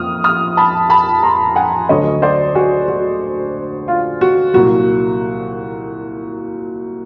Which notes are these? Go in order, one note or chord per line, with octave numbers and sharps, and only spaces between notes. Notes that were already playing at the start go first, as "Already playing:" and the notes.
Already playing: F2 A#3 D#6 F6
D#6 F6
A5 B5
A5 B5
A#5 C6
F#5 G#5
D2 D3 F#3 C#5 D#5
C5 D5
F#4 G#4
F#4
F4
F#4
C2 A#2 F#3 F#4